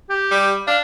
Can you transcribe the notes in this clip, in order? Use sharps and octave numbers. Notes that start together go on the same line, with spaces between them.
G4
G3
D4 F5